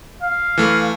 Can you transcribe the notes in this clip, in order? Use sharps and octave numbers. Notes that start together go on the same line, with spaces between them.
F5
E3 A3